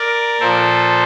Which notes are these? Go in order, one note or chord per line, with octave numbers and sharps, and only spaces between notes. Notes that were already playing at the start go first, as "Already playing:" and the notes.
Already playing: A#4 D5
A#2 F3 A4 C5